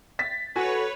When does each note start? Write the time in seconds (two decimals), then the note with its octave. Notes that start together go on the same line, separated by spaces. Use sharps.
0.19 A6 B6
0.56 F#4 A4 B4 C#5 G#5